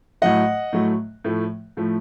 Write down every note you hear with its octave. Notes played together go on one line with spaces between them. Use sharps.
A2 F#3 A3 D#5 F#5
A2 F#3 A3
A2 F3 A3
A2 F3 A3